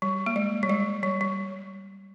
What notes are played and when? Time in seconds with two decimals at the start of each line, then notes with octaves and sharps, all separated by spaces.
0.02 G3
0.26 A#3
0.36 G#3
0.63 G3
0.69 G#3
1.03 G3
1.21 G3